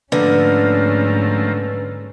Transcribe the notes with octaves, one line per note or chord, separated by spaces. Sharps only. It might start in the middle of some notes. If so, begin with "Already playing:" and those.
G#2 D3 F3 A3 A#3 C#4 B4